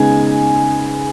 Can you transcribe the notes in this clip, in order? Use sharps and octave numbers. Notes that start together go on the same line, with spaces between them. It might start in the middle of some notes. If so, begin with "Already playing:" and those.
Already playing: C#3 G#3 B3 D#4 G#5